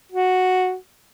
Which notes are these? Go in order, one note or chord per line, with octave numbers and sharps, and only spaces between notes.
F#4